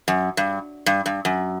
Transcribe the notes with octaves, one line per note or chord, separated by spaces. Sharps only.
F#2
G2
G2
G2
F#2